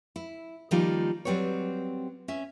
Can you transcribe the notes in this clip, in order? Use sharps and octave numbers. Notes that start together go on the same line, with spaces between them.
E4
D#3 F3 G3 A#3 D#4 F4
F#3 G3 C4 B4 C#5
C#4 E5